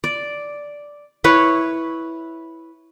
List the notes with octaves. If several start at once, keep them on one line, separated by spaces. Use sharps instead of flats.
D5
E4 B4 C#5